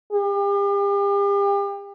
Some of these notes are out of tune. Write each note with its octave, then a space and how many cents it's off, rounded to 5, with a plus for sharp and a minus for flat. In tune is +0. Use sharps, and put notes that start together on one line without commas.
G4 +40